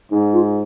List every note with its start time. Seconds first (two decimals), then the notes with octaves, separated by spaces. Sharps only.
0.11 G#2 D#4
0.33 F4